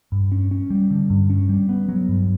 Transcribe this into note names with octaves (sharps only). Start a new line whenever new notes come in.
G2
C#4
C#4
G3
D3
G2
C#4
G3
B3
F#3
G2